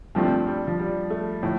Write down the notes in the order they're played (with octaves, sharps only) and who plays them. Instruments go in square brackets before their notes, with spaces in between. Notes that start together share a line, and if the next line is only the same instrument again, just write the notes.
[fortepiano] G2 F3 A3 C4 [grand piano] D4
[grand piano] G3
F3
G3
A3
[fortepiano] A2 [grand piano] F3